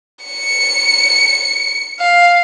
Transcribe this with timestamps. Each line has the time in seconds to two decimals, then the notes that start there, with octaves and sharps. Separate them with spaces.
0.25 C#7
2.00 F5